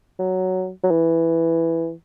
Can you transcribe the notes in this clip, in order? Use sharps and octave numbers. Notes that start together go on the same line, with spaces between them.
F#3
F#3
E3